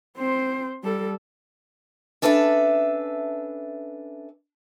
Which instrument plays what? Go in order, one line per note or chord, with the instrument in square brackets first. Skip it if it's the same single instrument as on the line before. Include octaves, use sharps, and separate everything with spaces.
[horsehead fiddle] C4 C5
G3 A4
[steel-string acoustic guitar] C#4 D4 A4 B4 D#5 E5